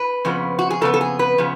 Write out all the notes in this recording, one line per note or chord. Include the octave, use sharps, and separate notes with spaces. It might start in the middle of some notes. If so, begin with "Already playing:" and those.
Already playing: B4
F2 C#3 F3 B3
F#4
G#4
F2 C#3 B3 A4
A4
G#4
B4
C#3 F3 B3